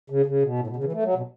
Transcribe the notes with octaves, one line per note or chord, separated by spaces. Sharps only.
C#3
C#3
B2
A2
B2
C#3
E3
A3
F#3
B2